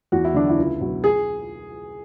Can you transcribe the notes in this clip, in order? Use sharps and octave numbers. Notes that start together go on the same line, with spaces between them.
E2 F#4
E4
D3 F#3 D4
E4
C#2
B2 F#3
G#4